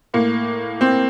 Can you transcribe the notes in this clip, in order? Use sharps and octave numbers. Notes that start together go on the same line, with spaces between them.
A2 A#3
C4